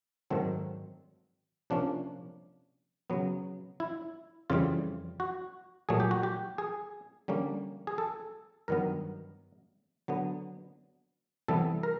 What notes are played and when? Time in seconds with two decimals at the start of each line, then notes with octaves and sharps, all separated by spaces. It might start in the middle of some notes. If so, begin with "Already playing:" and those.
0.30 G#2 D#3 F#3 A3 C4
1.70 C3 F3 A#3 C#4 D4
3.10 C#3 F#3 B3
3.80 E4
4.50 F2 C#3 E3 G3 F4
5.20 F#4
5.89 A#2 F#3 A3 G#4
6.00 G4
6.11 F#4
6.23 G4
6.58 G#4
7.28 D3 G3 A#3 C#4
7.87 G#4
7.98 A4
8.68 G2 D#3 F#3 B3 A#4
10.08 D3 F#3 B3
11.48 C3 E3 G3 B3 A4
11.83 A#4